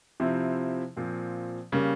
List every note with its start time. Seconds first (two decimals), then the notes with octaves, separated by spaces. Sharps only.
0.20 C3 F3 C4 E4
0.97 A#2 F3 C4
1.72 C#3 G3 A#3